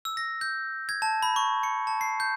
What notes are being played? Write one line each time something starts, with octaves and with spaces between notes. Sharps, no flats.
E6
A#6
G6
G#6
A5
B5
C#6
C#7
A5
C7
G6